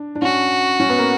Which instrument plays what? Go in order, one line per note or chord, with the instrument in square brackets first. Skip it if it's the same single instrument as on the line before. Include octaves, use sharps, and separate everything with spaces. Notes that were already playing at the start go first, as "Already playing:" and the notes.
Already playing: [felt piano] D4
D4
[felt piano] C#4 [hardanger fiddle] F#4
[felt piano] C#4
B3
A#3